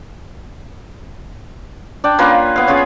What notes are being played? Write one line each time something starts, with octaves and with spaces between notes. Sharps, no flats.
D4 D5 G5
A#3 C#4 F4 B4
B3 F5
C#4 F4 G#4 C#5